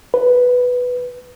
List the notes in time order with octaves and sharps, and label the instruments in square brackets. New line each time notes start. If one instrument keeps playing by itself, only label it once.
[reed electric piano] B4